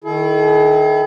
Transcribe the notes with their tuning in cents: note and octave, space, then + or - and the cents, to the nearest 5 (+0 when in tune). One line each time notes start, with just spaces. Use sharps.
D#3 -5 E4 +0 G#4 +45